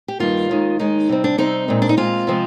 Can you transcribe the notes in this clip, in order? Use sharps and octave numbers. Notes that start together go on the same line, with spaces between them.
G4
G2 D#3 G3 A#3 F4
D#2 D#3 G#3
D#2 D#3 G#3 D#4
C3 G3 C4
D4
C3 G3 C4 D#4
A#2 G#3 C4
D4
D#4
A#2 G#3 C4 F4
C3 F3 G#3 C4